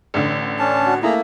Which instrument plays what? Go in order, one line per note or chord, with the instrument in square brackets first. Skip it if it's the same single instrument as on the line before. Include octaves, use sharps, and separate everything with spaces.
[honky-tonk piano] A1 D3
[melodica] C#4 D4 A5
[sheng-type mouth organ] F#4
[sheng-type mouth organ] A3 A#3 [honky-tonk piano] E4 [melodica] G#4 A#5